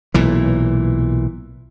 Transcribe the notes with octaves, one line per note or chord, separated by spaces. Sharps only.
B1 A#2 E3